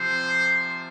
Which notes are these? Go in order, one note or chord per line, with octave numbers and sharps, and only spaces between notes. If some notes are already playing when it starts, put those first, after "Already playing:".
Already playing: C3 F3 C5